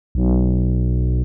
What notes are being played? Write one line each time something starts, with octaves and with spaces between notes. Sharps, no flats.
B1